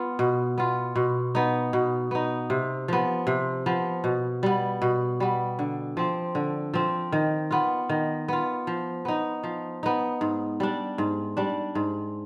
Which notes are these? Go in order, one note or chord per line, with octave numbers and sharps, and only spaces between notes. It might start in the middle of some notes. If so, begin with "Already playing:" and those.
Already playing: B3 F4
B2
B3 F4
B2
B3 D#4
B2
B3 D#4
C3
F3 B3
C3
F3 B3
B2
G3 B3
B2
G3 B3
D3
F3 C4
D3
F3 C4
D#3
B3 F4
D#3
B3 F4
F3
B3 D#4
F3
B3 D#4
G#2
G3 D4
G#2
G3 D4
G#2